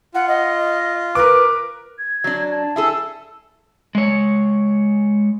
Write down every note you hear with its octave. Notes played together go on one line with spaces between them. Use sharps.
F4 F#5
D#5
A#4 B4 D6
G#6
F#3 D4
A5
E4 G#4 A4
G#3 C#5